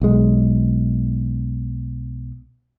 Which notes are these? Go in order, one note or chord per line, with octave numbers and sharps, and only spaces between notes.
B1 G#3